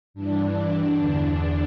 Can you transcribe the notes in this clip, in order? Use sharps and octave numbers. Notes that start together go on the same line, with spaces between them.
G2 E3 D4
D4
E2 D3